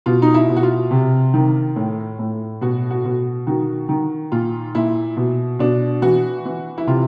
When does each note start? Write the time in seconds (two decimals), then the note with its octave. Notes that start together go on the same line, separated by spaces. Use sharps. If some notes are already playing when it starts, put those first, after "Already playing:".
0.06 B2 F4
0.22 D#4
0.34 E4
0.49 B2
0.56 F#4
0.63 F4
0.91 C3
1.34 D#3
1.76 A2
2.19 A2
2.61 B2 F#4
2.90 F#4
3.05 B2
3.47 D#3 F#4
3.89 D#3
4.32 A#2 F4
4.75 A#2 E4
5.17 B2
5.59 B2 D4
6.02 E3 F#4
6.45 E3
6.78 E4
6.87 C3 F4